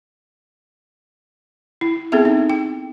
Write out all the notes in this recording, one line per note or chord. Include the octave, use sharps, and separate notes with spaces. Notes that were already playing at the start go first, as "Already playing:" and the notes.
E4
B3 C4 G#4 A4 E5
D#4
G5